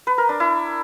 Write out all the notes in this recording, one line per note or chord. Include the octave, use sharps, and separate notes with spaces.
B4
A#4
D4
E4